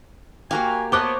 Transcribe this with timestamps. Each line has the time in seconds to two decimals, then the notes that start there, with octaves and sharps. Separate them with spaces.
0.51 A#3 F#4 G4 A#4 F5 G#5
0.92 B3 C5 C#5 D#5 A5 D6 F#6